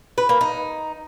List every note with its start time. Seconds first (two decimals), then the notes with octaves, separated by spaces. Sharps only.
0.18 B4
0.29 A#3
0.41 D#4